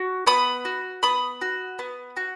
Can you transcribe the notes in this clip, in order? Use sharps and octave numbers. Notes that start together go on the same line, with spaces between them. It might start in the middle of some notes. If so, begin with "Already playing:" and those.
Already playing: F#4
B3 B5 D#6
F#4
B3 B5 D#6
F#4
B3
F#4